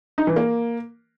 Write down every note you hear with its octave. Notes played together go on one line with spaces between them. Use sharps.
D#4
E3
A#3